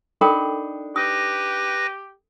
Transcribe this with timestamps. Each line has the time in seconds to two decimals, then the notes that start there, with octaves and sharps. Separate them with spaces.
0.21 D4 D#4 A4 A#4 G5 B5
0.96 G4 B4 D#6 A#6